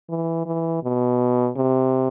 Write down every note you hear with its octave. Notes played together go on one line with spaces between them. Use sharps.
E3
E3
B2
C3